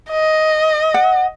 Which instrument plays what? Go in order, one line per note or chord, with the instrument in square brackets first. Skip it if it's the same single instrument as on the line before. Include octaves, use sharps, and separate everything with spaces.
[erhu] D#5
[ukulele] F#5